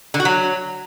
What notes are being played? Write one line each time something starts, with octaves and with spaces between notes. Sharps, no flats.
D3
F#4
F#3